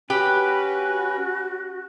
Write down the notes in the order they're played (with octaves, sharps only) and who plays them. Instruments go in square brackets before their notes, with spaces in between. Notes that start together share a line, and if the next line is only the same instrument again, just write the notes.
[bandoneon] C#4 [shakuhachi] F#4 [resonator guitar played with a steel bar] G4 [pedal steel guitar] B4